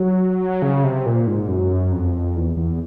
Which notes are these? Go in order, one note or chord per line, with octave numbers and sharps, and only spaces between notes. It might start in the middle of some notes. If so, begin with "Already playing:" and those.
Already playing: F#3
C#3
C3
A#2
G#2
F#2
F2
E2
E2